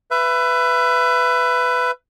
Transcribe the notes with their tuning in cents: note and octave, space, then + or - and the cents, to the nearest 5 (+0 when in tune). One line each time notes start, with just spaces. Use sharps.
B4 +10 E5 +25